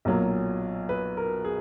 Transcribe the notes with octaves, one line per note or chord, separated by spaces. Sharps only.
B1 A#2 F#3 A#4
B4
A#4
G#4